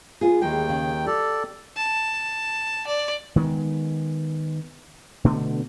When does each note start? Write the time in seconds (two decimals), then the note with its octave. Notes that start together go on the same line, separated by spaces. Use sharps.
0.21 B3 F4 G#4
0.41 D#2 D#3 E3 G#3 G5
0.69 C#3
1.06 G4 A4 D5
1.77 A5
2.87 D5
3.36 D#3 G#3 A#3 B3
5.24 B2 D3 A3 B3